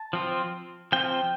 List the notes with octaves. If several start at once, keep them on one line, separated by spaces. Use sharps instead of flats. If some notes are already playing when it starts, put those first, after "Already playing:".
Already playing: A5
F3 C4 F4
F3 C4 F4 G5